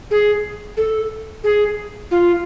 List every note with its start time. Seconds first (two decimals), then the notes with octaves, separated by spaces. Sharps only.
0.11 G#4
0.77 A4
1.44 G#4
2.11 F4